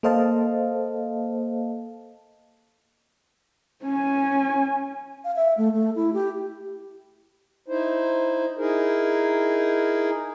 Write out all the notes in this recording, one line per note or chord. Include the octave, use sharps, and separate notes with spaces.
A#3 A4 C5 D#5 F5 A5
C#4 G#5
F5
E5
A3
A3
E4
G4
D#4 E4 C5
D#4 E4 G#4 A#4